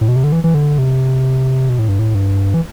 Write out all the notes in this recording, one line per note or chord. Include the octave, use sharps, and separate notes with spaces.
A2
B2
C3
D3
E3
E3
D3
C3
B2
A2
G2
A2
G2
E3